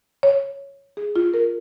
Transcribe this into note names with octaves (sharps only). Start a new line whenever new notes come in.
C#5
G#4
F4
A#4